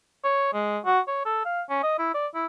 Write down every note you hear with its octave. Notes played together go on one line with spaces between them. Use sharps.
C#5
G#3
F#4
C#5
A4
F5
C#4
D#5
E4
D5
E4